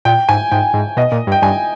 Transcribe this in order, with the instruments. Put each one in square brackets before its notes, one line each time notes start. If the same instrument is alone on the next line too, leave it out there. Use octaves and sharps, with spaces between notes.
[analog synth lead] A#2 [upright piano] G5
[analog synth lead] G#2 [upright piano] G#5
[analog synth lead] G#2 [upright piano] G5
[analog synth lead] G#2
[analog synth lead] B2 [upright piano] D#5
[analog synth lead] A#2
G2
[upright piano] G5
[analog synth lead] G2 [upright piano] G#5